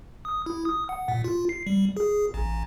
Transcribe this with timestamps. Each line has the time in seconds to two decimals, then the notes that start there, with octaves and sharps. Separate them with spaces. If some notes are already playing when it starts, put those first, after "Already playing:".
0.25 D#6
0.46 E4
0.65 D#6
0.89 F#5
1.08 A#2
1.24 F4
1.49 C7
1.67 G3
1.97 G#4
2.34 A1